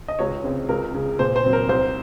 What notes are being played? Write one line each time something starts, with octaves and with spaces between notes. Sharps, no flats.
D#5
C#2 C#5
C#3 G#3 C4
C#2 A#4
C#3 G#3
A#2 C5
C5
F#3 C4
A#4
C2 C5